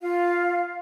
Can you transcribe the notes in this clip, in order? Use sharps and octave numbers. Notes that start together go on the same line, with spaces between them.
F4 F5